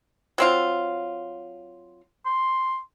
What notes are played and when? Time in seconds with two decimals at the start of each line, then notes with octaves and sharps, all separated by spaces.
0.38 F#3 C4 F4
2.26 C6